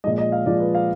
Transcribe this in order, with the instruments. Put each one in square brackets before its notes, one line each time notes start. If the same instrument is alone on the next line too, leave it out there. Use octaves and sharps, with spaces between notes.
[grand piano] A#2 F3 G#3 D#5
D#5
F5
A#2 F3 G#3 D5
B4
F5